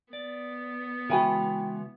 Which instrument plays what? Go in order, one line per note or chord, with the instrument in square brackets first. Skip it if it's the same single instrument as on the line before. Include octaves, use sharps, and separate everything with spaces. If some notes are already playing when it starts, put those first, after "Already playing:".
[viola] B3 [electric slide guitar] D5
[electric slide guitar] C#3 E3 G#3 [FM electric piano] E4 F#4 [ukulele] G5 G#5 B5